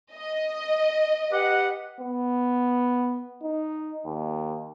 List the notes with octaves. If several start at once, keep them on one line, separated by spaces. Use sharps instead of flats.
D#5
G4 B4 F#5
B3
D#4
D#2